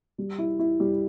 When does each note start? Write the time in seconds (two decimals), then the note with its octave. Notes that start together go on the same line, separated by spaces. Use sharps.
0.18 G3
0.38 E4
0.59 E4
0.80 G3